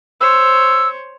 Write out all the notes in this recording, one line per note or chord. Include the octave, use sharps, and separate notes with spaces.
C5 C#5 E6